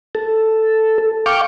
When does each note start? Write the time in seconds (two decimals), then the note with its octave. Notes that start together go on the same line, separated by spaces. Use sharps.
0.15 A4
1.26 F5 G5 C#6 D6